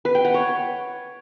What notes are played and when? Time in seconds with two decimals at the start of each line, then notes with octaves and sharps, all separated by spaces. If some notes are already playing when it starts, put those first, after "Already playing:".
0.05 B4
0.15 G5
0.25 F#5
0.34 C#5